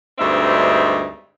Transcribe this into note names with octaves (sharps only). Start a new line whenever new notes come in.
D2 G2 G#3 C4 D#4 E5